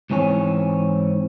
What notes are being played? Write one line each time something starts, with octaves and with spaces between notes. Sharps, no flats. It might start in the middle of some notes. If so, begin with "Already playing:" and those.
G#2 E3 C4 C#5 G#5